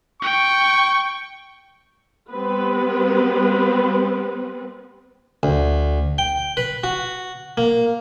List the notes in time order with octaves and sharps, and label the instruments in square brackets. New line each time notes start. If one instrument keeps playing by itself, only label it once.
[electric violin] G5 [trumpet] C#6
[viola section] G3 B3 C4 B4
[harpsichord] D2
G5
B4
F#4
A#3